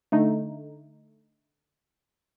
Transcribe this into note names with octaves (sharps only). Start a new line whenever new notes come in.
D3 A3 D#4